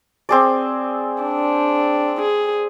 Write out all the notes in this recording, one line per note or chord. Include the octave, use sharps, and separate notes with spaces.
C4 G#4 D5
D4
G#4